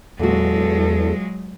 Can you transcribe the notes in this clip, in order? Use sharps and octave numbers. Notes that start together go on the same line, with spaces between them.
E2 A#2 F#3 G#3 F#4 A4